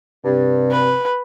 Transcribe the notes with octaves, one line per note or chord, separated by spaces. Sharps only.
G2 C3
B4